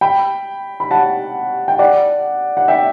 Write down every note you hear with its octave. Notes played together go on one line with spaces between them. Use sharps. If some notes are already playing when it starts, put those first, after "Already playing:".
G5 B5
B5
F#5 A5
G5
D5 F#5
F#5
E5 G5